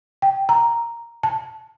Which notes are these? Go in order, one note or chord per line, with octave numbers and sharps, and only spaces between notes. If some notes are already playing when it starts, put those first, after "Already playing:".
G5
A#5
A5